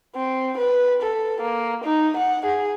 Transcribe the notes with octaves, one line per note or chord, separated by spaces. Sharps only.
C4
B4
A4
A#3
D#4
F#5
G#4